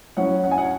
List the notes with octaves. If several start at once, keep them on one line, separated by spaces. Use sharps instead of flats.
F#3 C#4 E4 F#5
F#5
G#5
F#5